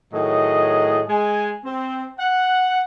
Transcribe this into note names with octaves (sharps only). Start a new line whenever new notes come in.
A2 D#3 F#3 G#4 D#5
G#3 G#5
C4
F#5